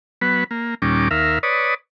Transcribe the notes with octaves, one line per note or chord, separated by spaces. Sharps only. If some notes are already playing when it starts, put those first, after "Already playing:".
F#3 B3 B4
A#3
D#2 A#2 G3 C#4 D6
D#2 A#4 E5 F5
B4 C#5 D5 D#6